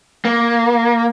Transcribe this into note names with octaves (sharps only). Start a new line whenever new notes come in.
A#3